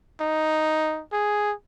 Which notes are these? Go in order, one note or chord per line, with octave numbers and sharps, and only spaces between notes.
D#4
G#4